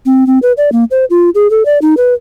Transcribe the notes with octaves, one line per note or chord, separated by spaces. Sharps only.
C4
C4
B4
D5
A#3
C5
F4
G#4
A4
D5
D#4
B4